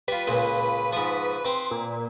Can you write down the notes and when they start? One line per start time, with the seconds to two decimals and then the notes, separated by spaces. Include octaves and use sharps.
0.08 G3 F4 B4
0.27 C#2 A#2
0.93 G#2 F3
1.45 C4 B4 C6
1.71 A#2